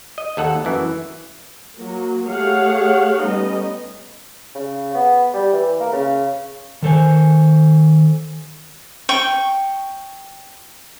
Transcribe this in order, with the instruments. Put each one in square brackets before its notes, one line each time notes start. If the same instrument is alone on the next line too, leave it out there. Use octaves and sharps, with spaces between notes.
[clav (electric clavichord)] D#5
D#2 A4 F#5
F#2 E3
[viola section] F#3 A#3
A3 G4 G#4 C#5 F5 F#5
G3 A3 B3 C#4 D#4 D#5
[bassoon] C#3
B3
G3
E3
A#3
C#3
[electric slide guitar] D#3 A4 C5 G#5
[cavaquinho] G5 C#6